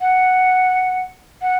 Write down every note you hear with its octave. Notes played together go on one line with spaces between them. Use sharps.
F#5
F#5